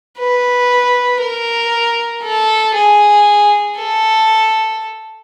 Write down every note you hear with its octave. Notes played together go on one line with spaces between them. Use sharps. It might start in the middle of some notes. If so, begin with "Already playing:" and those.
B4
A#4
A4
G#4
A4